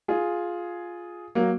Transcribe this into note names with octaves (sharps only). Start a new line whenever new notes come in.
F4 G#4
F#3 A#3